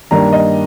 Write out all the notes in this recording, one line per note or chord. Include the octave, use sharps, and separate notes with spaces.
G2 D#3 G3 A#3 D4 A#5
D#5